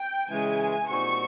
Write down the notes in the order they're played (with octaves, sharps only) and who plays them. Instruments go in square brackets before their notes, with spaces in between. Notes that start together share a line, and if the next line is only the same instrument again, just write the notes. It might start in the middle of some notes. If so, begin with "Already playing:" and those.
Already playing: [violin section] G5
[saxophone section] C#3 E3 G#3 [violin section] G#5
[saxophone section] A#2 G3 C4 D#4 F#4 [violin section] C#6